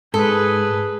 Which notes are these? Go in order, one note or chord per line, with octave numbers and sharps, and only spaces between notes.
G#2 G#4 A4 B4